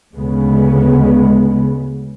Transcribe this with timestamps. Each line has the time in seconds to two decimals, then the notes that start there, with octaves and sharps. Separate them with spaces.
0.15 D2 C#3 G#3 B3